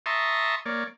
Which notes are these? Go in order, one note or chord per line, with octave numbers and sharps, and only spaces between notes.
E5 A5 A#5 C6 C#6 D#6
A#3 C#5 D5